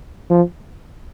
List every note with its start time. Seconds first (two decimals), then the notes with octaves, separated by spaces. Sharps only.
0.31 F3